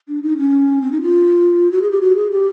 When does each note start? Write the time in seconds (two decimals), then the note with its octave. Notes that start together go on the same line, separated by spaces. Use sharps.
0.08 D4
0.23 D#4
0.38 C#4
0.82 C4
0.92 D#4
1.02 F4
1.72 F#4
1.82 G#4
1.91 G4
2.01 F#4
2.16 G#4
2.31 G4